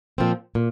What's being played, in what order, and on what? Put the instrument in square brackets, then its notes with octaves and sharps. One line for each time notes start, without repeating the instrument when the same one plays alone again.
[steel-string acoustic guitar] A#2 F3 C4
A#2